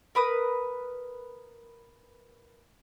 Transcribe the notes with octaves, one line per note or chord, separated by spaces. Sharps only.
A#4 B4 D#6